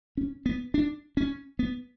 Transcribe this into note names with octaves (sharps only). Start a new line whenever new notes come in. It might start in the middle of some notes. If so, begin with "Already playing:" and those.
C#4
B3
D4
C#4
B3